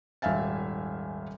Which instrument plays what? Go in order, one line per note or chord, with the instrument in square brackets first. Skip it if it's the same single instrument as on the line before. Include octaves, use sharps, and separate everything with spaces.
[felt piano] D#1 G#1 E5 F5 G#5 A6